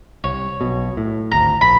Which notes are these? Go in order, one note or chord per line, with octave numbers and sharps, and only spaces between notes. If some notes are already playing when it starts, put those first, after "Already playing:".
C2 C#5
B1 B2
A2
G#1 D2 A#5
A#1 B5